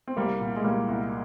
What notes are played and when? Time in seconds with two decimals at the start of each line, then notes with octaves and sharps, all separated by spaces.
0.08 C4
0.16 C2 G3 A#3
0.41 A#2
0.56 G#3
0.64 A#2 G3 A#3
0.88 C2